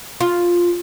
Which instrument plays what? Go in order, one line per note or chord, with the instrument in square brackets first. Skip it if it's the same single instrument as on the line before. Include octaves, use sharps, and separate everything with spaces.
[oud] F4